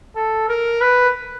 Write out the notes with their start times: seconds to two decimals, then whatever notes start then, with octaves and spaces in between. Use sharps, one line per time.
0.16 A4
0.49 A#4
0.81 B4